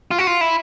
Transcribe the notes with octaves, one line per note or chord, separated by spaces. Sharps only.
F4
F#4
F4
E4